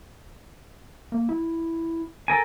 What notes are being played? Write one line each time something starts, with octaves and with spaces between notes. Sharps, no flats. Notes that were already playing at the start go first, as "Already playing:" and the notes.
A#3
E4
A4 A#4 G#5